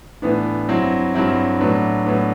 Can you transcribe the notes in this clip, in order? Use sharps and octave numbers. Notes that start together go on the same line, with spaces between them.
A2 E3 B3 D4
G2 F#3 C4 E4
G2 F#3 C4 E4
A2 F#3 B3 D4
A2 F#3 B3 D4